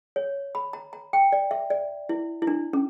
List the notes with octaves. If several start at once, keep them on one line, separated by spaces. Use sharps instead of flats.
C#5
B5
A#5
A#5
G5
D5
E5
D5
E4
E4
D4
C#4